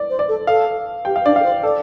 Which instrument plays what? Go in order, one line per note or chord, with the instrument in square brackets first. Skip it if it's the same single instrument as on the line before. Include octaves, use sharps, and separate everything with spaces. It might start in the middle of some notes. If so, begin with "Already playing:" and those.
Already playing: [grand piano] D5
[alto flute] C5
[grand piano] D5
[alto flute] A4
[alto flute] A4 [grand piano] F5
[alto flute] G4 [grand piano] G5
[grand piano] F5
[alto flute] D4 [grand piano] D5
[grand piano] F5
[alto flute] A4
C5
[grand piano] A4 [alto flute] D5